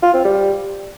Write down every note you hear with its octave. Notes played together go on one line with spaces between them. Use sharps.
F4
C4
G3